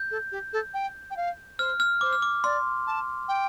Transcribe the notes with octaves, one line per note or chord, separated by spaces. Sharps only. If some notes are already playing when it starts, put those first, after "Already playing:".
Already playing: G6
A4
G4
A4
G5
G5
F5
C5 F6
F6
C5 D6
F6
D6
D5 C6
A5
G5